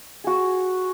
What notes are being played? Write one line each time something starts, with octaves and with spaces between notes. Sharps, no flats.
F#4 G#4